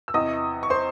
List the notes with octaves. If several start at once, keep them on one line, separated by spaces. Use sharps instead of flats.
E6
E2 C3 E3 D#5 D#6
C#6
C5 C6